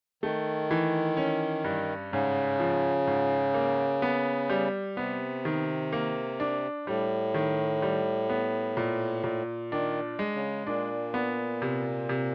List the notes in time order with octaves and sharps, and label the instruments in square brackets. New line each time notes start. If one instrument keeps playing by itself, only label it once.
[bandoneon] D#3 [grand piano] A3
[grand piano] E3
C#4
G2
[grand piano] G#2 [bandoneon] C#3
[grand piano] F3
G#2
A#3
B3
G3
[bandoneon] C3 [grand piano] B3
[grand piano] D#3
A#3
D4
[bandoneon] A2 [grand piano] G3
[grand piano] D#3
G3
B3
A#2
A#2
[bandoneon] D#3 [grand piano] D4
[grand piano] G#3
[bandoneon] C#3
[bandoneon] A#2 [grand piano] D4
[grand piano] B3
C3
C3